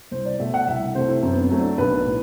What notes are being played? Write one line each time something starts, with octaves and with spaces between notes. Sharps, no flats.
C2 C5
D5
B2 A3 E5
F#5
C2 E5
C3 E3 A3 C5
E4
F#2 C4
B3
C4
F#3 A3
D4
B1 B4
A2